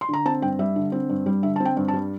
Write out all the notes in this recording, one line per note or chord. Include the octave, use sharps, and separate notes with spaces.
C6
D3 A#5
C4 A5
G2 G5
G3 E5
D3
C4
G2
G3
D3 E5
C4 A5
G5
G2
A5
G3